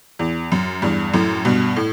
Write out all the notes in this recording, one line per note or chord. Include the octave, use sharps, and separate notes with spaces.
E2
F#2
E2 G2
F#2 A2
G2 B2
A2